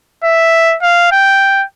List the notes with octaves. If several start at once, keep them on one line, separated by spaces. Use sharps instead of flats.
E5
F5
G5